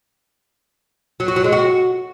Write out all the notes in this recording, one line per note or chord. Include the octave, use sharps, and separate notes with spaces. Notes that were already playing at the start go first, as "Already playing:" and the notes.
F#3
F#4
F#3
G#3
F#4